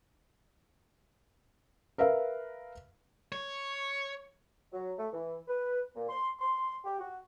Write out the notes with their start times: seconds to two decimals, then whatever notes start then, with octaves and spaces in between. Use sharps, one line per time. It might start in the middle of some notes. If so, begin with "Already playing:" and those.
1.98 A#4 B4 E5 F5
3.32 C#5
4.72 F#3
4.98 A3
5.13 E3
5.48 B4
5.95 A#2
6.08 C6
6.39 C6
6.84 G4
6.99 F#4